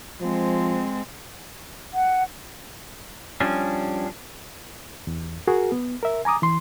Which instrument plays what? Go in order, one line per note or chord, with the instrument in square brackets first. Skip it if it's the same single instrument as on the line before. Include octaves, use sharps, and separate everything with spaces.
[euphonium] F3 [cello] G#3 C4
[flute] F#5
[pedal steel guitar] F3 G3 C#4 D4
[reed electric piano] E2
F#4 G#4 A#4
B3
A#4 E5
G#5 A#5 D6 D#6
E3 C6